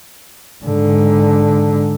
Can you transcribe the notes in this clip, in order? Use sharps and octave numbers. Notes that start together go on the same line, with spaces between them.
G#2 D3